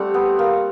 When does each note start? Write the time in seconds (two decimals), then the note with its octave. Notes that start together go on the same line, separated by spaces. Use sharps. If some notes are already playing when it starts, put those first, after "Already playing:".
Already playing: G3 A3 C4 F#5
0.14 B3
0.39 A#3